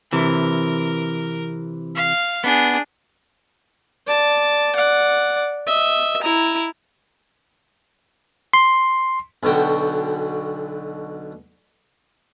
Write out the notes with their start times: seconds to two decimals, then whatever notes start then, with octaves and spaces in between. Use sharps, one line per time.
0.13 C3 E3 A#4
1.96 F5
2.44 B3 D4 G#4
4.07 D5 A5
4.75 D5 F#5
5.67 D#5 E5
6.22 E4 A#5
8.53 C6
9.43 B1 B2 D3 F#4 G5